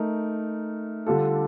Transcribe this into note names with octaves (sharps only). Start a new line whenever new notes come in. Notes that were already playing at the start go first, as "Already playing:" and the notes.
Already playing: A3 D#4 A#4
D3 G3 D4 F4 A4